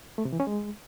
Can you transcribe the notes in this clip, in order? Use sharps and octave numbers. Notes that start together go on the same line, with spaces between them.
A3
C3
E3
C#4
G#3